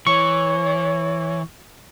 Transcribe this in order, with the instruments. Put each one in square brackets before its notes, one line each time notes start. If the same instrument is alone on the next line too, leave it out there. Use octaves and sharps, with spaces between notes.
[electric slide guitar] E3 [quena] C#5 [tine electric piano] C#6